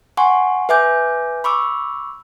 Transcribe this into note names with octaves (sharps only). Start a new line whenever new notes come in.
F#5 G#5 C6 C#6
B4 E5 G#5 D6 G6
B5 C#6 D6 E6